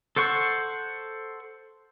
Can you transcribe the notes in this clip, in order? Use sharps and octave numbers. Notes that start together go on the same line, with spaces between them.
A4 C5 F#5 C#6